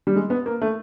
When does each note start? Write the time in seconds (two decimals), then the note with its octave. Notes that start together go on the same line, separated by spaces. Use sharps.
0.07 G3
0.16 G#3
0.30 B3
0.46 A#3
0.61 A3